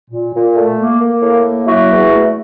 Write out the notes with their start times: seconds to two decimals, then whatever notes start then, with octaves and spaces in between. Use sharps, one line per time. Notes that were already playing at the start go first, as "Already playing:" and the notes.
0.11 A#2
0.33 A#2
0.55 A3
0.78 A#3
1.00 A#3
1.22 A2
1.45 A#3
1.67 F#3 E4 F#4
1.90 E2
2.12 A3